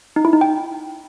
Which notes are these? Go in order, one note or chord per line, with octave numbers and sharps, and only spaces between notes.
D#4
E4
D#4
G5